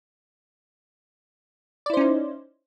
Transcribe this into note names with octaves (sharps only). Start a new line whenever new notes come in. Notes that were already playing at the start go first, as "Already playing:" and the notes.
C#4 D#4 E4 C5 D5